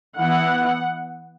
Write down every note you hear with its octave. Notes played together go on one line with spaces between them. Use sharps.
E3 B3 E4 F#5